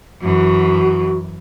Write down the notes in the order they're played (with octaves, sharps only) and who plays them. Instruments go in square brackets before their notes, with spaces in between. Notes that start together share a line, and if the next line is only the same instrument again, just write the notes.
[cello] F#2 E3 [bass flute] F#4